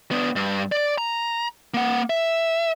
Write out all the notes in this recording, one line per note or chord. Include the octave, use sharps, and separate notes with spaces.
B3 D4
G2
D5
A#5
A#3 F#5
E5